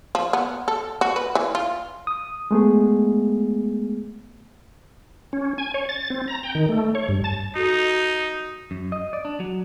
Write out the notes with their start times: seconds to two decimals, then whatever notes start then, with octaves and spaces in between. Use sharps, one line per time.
0.15 F3
0.33 B3
0.68 A4
1.01 F#4
1.16 B4
1.35 E3
1.55 F4
2.07 D#6
2.51 G#3 A3 B3 G#4
5.33 C#4
5.58 G#5
5.74 C#5
5.89 A6
6.10 C4
6.28 A#5
6.43 G5
6.55 D#3
6.69 A3
6.95 C#5
7.09 G2
7.24 A5
7.56 D#4 F#4 A4
8.71 F#2
8.92 D#5
9.13 D5
9.25 D4
9.40 F#3